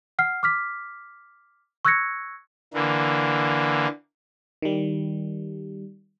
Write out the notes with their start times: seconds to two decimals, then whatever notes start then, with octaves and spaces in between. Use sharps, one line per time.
0.19 F#5 F6 C7
0.43 D6 F6 B6
1.85 C#6 E6 F#6 G#6 A#6 C#7
2.74 D3 E3 A#3
4.62 D#3 G3